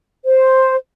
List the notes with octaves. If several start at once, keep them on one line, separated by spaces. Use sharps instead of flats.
C5